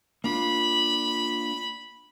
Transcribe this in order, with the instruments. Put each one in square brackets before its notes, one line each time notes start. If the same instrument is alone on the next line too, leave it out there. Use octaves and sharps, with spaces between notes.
[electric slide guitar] A#3 D4 F4 [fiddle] B5